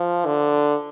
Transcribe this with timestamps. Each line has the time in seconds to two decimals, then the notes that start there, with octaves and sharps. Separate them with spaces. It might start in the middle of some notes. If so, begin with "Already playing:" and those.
Already playing: F3
0.26 D3